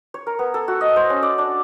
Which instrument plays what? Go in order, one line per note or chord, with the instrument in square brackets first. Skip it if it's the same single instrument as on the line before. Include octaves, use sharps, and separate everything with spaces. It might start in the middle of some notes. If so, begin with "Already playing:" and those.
[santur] C#5
A#4
B3
A4
F#4
D#5
C5
C#4
D5
D4